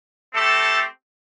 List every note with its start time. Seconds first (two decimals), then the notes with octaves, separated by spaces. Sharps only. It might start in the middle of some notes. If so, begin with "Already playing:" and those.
0.34 A3 C4 G4 A4 A5